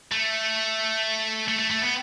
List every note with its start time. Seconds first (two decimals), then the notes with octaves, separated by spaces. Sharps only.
0.12 A3
1.48 A3
1.59 A3
1.70 A3
1.81 B3